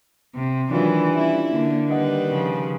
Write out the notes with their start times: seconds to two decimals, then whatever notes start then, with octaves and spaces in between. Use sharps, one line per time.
0.35 C2 C3
0.71 D#3 E3 F#3 G#3 D4 F4 D5
1.10 G3 C#4 E4
1.52 D3 A#3
1.89 D#3 G3 B4 D5 D#5 F#5
2.29 C#3 F3